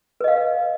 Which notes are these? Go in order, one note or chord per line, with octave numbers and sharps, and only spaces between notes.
B4 D#5 F5